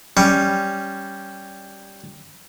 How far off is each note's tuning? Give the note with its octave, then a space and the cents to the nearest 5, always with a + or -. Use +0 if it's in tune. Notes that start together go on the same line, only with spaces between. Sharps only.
G3 +0 C#4 +0